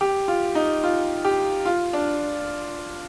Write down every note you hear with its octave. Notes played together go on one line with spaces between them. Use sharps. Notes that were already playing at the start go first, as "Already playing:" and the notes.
G4
F4
D#4
F4
G4
F4
D4